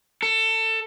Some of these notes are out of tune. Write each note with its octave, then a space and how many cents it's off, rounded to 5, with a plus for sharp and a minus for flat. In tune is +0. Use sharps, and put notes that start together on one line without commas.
A4 +20